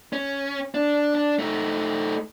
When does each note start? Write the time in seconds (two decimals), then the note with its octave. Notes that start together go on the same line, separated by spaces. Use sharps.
0.13 C#4
0.75 D4
1.15 D4
1.39 A3 D#4